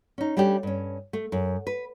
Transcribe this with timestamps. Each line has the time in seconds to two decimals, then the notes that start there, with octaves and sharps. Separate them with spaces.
0.18 C#4 D#4
0.37 G3 A3 C#4 D4 G4
0.63 G2 C#4
1.13 A3
1.32 F#2
1.67 B4